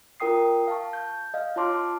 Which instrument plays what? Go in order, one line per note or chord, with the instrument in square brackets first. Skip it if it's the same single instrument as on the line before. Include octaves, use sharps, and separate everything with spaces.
[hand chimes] F4 A#4 G5 D#6 C7
F5 A5 C#6
G6
D#5 F5
F4 C#5 A5 C6 D6 F6